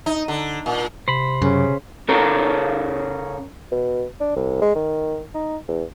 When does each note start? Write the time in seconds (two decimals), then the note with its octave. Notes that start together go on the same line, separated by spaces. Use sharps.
0.06 D#4
0.28 D3
0.66 A#2
1.08 C3 C5 B5
1.42 F#2 C#3
2.08 C#3 C#4 A4 A#4
3.72 B2
4.20 D4
4.36 C2
4.61 G#3
4.75 D#3
5.34 D#4
5.68 E2